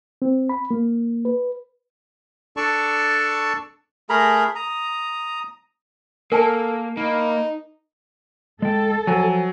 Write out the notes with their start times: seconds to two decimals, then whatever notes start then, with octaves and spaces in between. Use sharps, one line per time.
0.22 C4
0.49 B5
0.71 A#3
1.25 B4
2.57 D4 A4 D5 A5 C#6
4.10 A3 G#4 A#4 A#5 B5
4.55 A#5 D#6
6.32 A#3 A4 A#4 G#5 A5
6.97 A#3 D#4 B5
8.62 G#3 A4 G5
9.07 F3 F#3 G#5